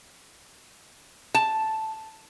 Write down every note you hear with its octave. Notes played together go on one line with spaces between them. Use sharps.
A5